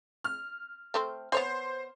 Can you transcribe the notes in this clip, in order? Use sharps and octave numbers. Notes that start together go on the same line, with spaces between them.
F6
A3 C4 C5
B3 C5 C#5 G#5